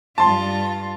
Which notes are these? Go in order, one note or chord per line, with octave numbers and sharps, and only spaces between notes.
G2 F4 A5 C6